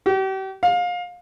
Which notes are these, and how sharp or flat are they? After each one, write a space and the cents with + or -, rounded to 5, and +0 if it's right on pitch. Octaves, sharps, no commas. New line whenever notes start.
G4 -40
F5 +25